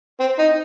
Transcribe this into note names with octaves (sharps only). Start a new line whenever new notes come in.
C4
D#4